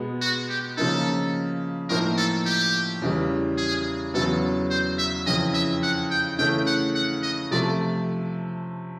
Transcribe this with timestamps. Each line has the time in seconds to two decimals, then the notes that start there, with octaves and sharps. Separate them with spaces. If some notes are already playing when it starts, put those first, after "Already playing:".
Already playing: B2 G#3 B3
0.21 F#4
0.49 G4
0.77 C#3 F3 A#3 D#4 A4
1.89 A2 F3 A#3 D#4 A#4
2.17 A4
2.46 G4
3.02 E2 C#3 E3 G3
3.57 G#4
4.14 E2 C#3 F#3 B3 A4
4.70 C5
4.98 E5
5.26 F2 C#3 E3 D#5
5.54 E5
5.83 F#5
6.11 G5
6.39 C#3 E3 A3 G5
6.66 F#5
6.95 F#5
7.23 D#5
7.51 C3 F3 A3 D5